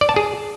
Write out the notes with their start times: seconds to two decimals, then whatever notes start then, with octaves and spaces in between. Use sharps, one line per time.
0.01 D5
0.09 A5
0.16 G#4